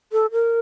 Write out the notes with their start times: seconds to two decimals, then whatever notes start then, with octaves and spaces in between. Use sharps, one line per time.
0.12 A4
0.32 A#4